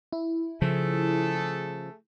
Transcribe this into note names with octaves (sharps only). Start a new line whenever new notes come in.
E4
C#3 F3 A3 G#4 A4